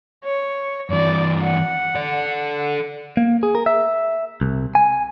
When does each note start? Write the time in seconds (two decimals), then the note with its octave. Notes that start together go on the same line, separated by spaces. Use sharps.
0.24 C#5
0.90 G2 E3 D5
1.43 F#5
1.95 A4 D5
3.17 A#3
3.43 G#4
3.55 A#4
3.66 E5
4.41 C2
4.75 G#5